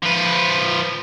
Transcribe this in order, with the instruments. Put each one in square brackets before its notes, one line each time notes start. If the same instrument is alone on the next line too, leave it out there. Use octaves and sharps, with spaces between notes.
[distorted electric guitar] F3 B4